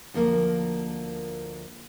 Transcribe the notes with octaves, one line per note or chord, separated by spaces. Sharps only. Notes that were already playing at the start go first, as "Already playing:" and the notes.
D2 F3 A#3 F4 A#4